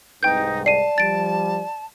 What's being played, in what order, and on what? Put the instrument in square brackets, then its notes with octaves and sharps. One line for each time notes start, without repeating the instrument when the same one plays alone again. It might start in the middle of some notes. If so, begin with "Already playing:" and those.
[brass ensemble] C2 G#2 [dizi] D#4 [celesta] B4 [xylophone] G5 G6
[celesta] D5 [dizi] A5 [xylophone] C7 D#7
[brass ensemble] F3 G3 [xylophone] A6 D7